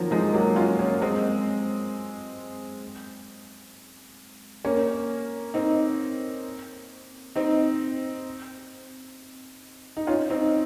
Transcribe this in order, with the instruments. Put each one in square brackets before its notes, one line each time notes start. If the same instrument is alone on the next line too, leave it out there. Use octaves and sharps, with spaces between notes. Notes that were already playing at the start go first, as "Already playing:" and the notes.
Already playing: [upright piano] D#3 F3 F#3 A#3
F3 G#3
F#3 A#3
C#4 F4
A#3 C#4
G#3 C4
A#3 C#4
C4 D#4
C4 D#4
D#4
C#4 F4
C4 D#4